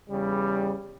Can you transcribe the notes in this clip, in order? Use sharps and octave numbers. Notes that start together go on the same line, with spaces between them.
E2 C#3 G3